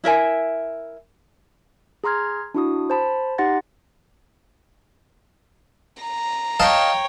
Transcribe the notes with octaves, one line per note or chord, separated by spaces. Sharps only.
E4 A#4 E5 G#5
G#4 A#5 C6 F6 G#6
D4 E4 F#4 D#6
C5 A5 B5
D#4 G4 F#5 C6 A6 A#6
A#5
C#5 D#5 F5 G5 A5